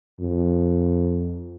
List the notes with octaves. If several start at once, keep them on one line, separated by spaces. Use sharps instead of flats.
F2